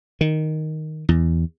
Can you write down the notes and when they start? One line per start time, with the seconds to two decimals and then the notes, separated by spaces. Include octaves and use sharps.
0.21 D#3
1.09 E2